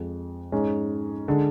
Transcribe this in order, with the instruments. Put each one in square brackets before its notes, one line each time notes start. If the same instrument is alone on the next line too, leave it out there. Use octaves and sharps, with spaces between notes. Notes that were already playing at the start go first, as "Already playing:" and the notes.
Already playing: [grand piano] F2 F3 G#3
G#2 G#3 C#4
D3 G#3 D4